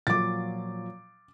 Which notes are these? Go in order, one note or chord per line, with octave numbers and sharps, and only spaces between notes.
A#2 F3 F#3 D6 A6